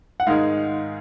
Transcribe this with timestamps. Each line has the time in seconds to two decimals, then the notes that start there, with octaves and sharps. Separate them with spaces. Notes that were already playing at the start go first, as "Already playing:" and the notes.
0.20 F#5
0.27 G#2 D#3 G#3 F5